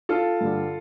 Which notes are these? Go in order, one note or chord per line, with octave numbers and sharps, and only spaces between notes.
F4 A4
G2 D3 G3